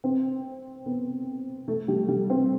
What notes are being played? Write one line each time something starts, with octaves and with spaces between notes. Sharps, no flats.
C4
B3
A3
G3
G3
C4